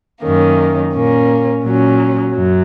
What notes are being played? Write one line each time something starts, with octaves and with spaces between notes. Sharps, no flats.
F#2 D#3 A#3 C#4
A#2 A#3 C#4
A#2 F#3 C#4
F#2 F#3